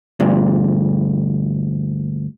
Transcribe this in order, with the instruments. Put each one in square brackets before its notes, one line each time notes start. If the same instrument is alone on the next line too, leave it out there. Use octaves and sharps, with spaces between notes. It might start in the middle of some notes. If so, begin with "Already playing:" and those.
[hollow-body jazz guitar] D2 G2 A#2